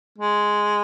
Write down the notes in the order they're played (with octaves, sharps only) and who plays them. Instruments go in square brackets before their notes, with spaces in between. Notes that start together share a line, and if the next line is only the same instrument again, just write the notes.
[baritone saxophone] G#3